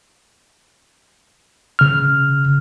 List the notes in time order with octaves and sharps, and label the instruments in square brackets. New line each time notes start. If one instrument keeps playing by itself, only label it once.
[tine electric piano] C#3 F6